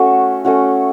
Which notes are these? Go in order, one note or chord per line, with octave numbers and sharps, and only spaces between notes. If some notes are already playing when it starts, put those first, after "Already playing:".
Already playing: A3 C#4 F#4
A3 C#4 F#4